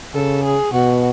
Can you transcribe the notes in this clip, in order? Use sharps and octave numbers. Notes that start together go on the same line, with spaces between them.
C#3 A4
G#4
B2 F#4